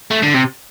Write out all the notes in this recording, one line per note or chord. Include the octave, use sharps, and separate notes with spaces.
A3
D3
C3